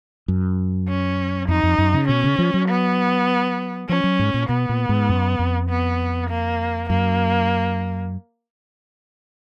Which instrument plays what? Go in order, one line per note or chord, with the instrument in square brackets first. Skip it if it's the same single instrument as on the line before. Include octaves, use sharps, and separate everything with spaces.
[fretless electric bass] F#2
[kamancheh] C#4
[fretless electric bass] F2 [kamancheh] D#4
[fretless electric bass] F2
F#2
C#3
[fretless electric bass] B2 [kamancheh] C#4
[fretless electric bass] C#3
F3
F#3
[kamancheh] B3
[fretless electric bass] F3 [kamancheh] C#4
[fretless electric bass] F#3
G#2
A#2
[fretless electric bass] B2 [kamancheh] B3
[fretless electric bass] A#2
G#2
F#2
F2
[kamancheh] B3
A#3
[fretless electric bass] F#2 [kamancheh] A#3